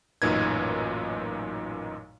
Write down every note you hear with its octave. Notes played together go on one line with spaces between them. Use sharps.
A1 F#2 A#2 D#4 B4 G#6